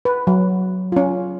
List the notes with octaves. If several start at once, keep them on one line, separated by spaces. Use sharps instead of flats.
B4
F#3
C#4 F4